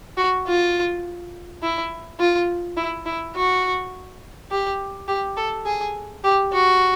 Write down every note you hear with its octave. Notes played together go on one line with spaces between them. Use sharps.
F#4
F4
E4
F4
E4
E4
F#4
G4
G4
A4
G#4
G4
F#4